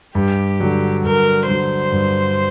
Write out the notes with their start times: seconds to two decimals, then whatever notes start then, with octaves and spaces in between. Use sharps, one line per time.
0.15 G2 G4
0.60 D3 F#3
1.04 G2 A#4
1.48 D3 F#3 C5
1.92 G2